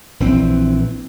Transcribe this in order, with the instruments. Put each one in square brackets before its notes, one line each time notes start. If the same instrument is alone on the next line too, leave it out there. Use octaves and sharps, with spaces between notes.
[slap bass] A#1 E3 C4